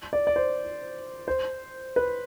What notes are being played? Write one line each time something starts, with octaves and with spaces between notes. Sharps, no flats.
D5
D5
C5
C5
B4